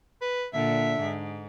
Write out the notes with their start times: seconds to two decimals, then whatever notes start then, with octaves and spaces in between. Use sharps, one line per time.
0.21 B4
0.53 A#2 D3 E5
1.00 G#2